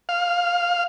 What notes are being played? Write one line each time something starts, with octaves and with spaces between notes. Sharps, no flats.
F5